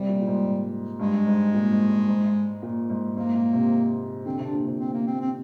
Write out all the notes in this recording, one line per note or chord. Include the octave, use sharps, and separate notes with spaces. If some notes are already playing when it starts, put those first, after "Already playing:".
Already playing: C3 G3
A#2
A#2
G#2
G2 G#3
G#2
A#2
G#2
G#2
G#2
A#2
G#2
G#2 A#3
A#2
C3
D3 C4
C3 D4
A#2
C3
C4
A#3
C4
C4